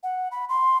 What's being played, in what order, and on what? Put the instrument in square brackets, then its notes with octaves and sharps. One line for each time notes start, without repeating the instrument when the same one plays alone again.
[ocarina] F#5
B5
C6